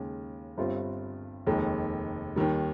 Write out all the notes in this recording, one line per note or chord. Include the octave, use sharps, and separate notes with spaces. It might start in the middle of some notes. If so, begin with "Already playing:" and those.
Already playing: D#2 C#3 G#3
G1 G2 G3 C4 F4
F1 D#2 D#3 G#3 D#4
D#2 D#3 G3